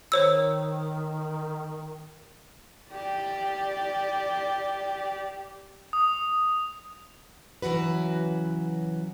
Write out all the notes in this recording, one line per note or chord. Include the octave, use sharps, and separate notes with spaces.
D#3 C5 C#5 E6
G4 D5
D#6
C#3 E3 F#3 F#4 B4